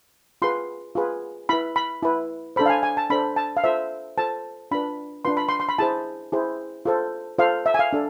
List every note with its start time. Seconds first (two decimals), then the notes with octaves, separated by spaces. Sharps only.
0.42 F4 G#4 B4 C6
0.95 F4 G#4 B4
1.49 E4 B4 B5
1.76 B5
2.03 E4 B4
2.56 D4 A4 C5 B5
2.66 F5
2.70 G#5
2.83 G#5
2.97 A5
3.10 D4 A4 C5 B5
3.36 A5
3.57 F5
3.64 F4 A4 C5 E5
4.18 F4 A4 C5 A5
4.71 D4 F4 B4 B5
5.25 D4 F4 B4 C6
5.37 B5
5.49 C6
5.60 C6
5.69 B5
5.78 E4 G#4 C5 A5
6.32 E4 G#4 C5
6.86 F4 A4 C5
7.39 F4 A4 C5 F5
7.66 E5
7.74 G#5
7.79 F5
7.93 D4 A4